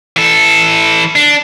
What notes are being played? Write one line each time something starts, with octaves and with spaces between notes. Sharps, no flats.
E3 A4
D4